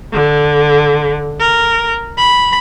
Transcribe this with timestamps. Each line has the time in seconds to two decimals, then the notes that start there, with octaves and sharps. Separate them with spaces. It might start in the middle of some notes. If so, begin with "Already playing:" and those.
0.13 D3
1.40 A#4
2.18 B5